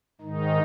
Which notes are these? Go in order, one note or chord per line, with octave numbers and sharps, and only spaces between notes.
G#2 D#3 D#4